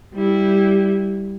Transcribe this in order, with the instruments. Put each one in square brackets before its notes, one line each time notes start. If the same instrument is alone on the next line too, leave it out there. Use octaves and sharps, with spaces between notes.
[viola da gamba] G3 E4